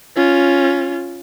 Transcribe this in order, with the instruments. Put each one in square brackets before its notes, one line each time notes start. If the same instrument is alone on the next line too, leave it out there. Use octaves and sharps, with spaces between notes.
[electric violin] C#4 F4